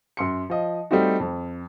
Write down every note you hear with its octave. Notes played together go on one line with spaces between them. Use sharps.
F#2 C6 C#7
F3 D#5
G3 A3 C4 D#4 F#4
F2